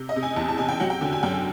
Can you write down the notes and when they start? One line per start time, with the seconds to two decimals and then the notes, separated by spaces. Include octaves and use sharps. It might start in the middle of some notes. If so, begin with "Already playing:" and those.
Already playing: C3
0.09 D#5
0.16 C3
0.23 G#5
0.36 E2 A5
0.48 A5
0.58 C3 G#5
0.69 G5
0.80 F#3 F#5
0.90 G5
1.01 D3 G#5
1.12 G#5
1.23 F#2 G5